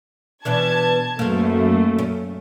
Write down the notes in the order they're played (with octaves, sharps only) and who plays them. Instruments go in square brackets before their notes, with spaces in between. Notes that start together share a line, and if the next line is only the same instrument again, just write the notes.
[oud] B2 E3 D4 [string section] A5 G#6
[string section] F#2 A3 [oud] A#3 C5
[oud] C#4